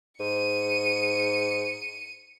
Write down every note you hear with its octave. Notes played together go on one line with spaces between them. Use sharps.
G#2 C#7 D#7